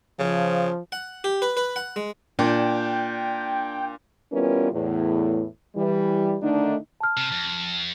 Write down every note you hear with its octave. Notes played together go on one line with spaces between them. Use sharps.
C#3 F3
F#5
G4
B4
B4
F#5
G#3
A#2 D4 G5
E3 G3 B3 C#4 F4 A#4
E2 A2
E3 G3
D3 D#3 A3 D4 D#4
A5 F6
C3
F2